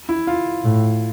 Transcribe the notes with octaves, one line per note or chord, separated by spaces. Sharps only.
E4
F4
A2